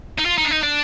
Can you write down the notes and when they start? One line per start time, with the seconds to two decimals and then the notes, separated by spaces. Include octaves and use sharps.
0.18 D#4
0.25 F4
0.38 D#4
0.44 D4
0.51 D#4
0.63 D4